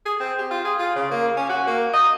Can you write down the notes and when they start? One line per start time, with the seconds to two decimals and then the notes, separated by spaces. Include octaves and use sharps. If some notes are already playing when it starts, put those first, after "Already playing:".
0.06 G#4
0.20 C4
0.38 G4
0.51 F4
0.65 G#4
0.79 F4
0.96 C#3
1.11 A#3
1.37 C#4
1.49 F#4
1.67 A#3
1.93 D#5